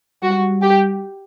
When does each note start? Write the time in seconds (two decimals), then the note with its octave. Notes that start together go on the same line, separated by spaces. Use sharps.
0.23 G3 F#4
0.61 G4